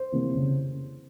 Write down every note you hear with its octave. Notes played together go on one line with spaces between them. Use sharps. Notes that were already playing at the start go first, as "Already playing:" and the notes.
Already playing: C5
C3 E3 A#3
C#3